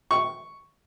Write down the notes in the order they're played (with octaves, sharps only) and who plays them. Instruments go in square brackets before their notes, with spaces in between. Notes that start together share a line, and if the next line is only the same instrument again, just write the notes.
[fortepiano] C#6